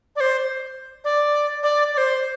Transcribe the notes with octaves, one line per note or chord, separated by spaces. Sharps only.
D5
C5
D5
D5
D5
C5